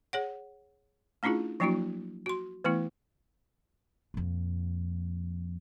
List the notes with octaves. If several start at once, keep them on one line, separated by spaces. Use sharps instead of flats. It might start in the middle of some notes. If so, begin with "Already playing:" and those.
G#4 C#5 F#5
A3 C#4 D4 E4 F4 G#4
F3 F#3 A#3 D4 E4 F#4
F#4 C6
E3 A3 B3 E4
F2 A#2